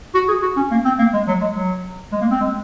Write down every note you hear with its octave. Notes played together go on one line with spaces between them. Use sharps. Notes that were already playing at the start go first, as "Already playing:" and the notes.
F#4
G#4
F#4
C#4
A#3
C4
A#3
G#3
F#3
G#3
F#3
G#3
A#3
C4
G#3